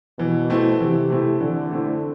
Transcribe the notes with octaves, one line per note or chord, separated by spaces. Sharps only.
B2 E3
A3 C4 E4
C3 E3
A3 C4 E4
D3 E3
A3 C4 E4